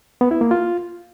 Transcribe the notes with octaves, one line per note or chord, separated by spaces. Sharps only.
B3
E4
A#3
F4